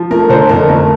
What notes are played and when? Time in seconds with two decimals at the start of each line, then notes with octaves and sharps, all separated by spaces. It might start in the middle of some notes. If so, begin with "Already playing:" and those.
Already playing: F3
0.11 A3 A#4
0.29 D3 A4 C5
0.49 F2 A#4
0.69 A3 A#4